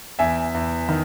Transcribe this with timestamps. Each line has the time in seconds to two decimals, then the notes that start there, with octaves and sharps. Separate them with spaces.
0.19 E2 E5 G#5
0.54 E2
0.89 D#3